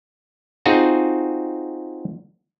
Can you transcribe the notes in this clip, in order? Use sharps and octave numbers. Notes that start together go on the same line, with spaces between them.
C4 D#4 F4 F#4 G#4